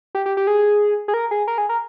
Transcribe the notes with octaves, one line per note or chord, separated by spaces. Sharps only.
G4
G4
G4
G#4
G#4
A#4
G#4
A#4
G#4
A#4